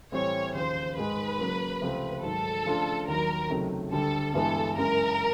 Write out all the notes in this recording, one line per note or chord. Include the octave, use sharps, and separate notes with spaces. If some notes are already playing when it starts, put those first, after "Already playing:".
A2 E3 G3 C4 C#5
D#2 C#3 F3 C5
G#2 D#3 G#3 B4
C#3 F#3 A#3
C#2 C3 F3 A3 C4
G#2 D#3 F#3 A4
C#3 F3 A3 D4 F4
D#2 D#3 F#3 A#4
C#2 C3 D#3 F#3 A3
D2 D3 G3 A4
G2 E3 G#3 B3 E4 A4
F#2 C#3 E3 G#3 A#4